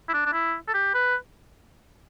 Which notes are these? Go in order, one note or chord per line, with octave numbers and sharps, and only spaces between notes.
E4
D4
D4
E4
A4
G4
B4